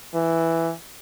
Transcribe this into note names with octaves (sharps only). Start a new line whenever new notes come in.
E3